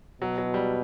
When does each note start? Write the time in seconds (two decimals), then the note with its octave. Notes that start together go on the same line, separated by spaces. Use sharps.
0.22 B2 F#3
0.38 F#3
0.54 G3